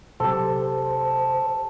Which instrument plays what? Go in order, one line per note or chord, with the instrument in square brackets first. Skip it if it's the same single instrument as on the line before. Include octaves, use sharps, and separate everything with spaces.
[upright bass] C3 F#3 [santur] G4 A4 [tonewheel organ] C5